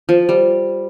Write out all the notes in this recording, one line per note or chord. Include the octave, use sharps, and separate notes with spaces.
F3
G3